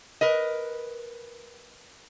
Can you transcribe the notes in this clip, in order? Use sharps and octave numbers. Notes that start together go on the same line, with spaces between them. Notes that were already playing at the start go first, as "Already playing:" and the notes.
A#4 B4 D#5